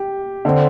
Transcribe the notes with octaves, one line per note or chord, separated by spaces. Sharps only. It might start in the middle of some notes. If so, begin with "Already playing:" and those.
Already playing: G4
D3 C4